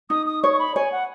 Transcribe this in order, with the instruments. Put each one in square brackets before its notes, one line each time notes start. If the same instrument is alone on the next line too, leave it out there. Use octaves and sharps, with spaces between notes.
[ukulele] D#4 [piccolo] D#6
[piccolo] D#6
[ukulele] C#5 [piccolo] C#6
[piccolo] C#6
B5
[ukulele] C#5 [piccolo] G#5
[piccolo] F#5